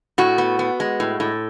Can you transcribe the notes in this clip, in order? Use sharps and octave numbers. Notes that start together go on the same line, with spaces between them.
A2 F#4
B3
B3
G#3
A2
A2